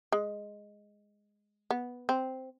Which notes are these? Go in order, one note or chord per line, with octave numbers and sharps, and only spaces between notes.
G#3
B3
C4